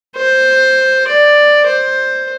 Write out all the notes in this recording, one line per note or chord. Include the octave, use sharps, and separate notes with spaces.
C5
D5
C5